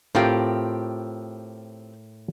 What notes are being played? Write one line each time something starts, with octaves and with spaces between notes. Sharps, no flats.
A2 C4 F4 G4 A#4 G5